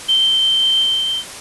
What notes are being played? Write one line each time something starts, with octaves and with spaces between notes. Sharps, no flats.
G7